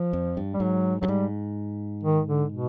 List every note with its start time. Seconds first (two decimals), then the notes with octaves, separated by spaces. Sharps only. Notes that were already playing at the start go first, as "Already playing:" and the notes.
Already playing: F3
0.13 F2
0.37 G2
0.54 G3
0.60 G#2 F#3
1.01 G2 F#3
1.08 G#2 G3
2.04 D#3
2.28 D3
2.52 B2